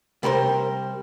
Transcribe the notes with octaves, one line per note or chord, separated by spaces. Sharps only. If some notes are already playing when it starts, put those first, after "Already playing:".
C3 G3 A#4 C5